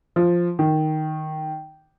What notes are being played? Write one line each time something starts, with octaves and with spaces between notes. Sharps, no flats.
F3
D#3